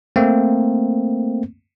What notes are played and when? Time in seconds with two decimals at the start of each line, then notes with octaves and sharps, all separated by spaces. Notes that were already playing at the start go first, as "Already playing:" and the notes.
0.16 A3 A#3 C4